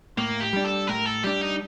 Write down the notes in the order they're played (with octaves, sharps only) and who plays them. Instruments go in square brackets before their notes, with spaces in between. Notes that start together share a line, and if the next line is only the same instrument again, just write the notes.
[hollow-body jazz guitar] A2 [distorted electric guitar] A#3
[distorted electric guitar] G4
[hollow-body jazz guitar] G3 D4
[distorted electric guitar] A4
[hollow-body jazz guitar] A2 [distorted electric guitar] A#4
[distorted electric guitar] A4
[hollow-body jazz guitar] G3 D4 [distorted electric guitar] G4
[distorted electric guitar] D#4